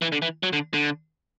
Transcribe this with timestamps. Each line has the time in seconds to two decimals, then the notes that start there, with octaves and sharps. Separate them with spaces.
0.02 E3
0.12 D3
0.22 E3
0.43 F#3
0.53 D3
0.74 D3